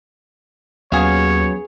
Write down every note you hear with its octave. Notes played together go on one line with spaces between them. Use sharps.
D#2 F#3 B3 C#4 G#4 C#5 F5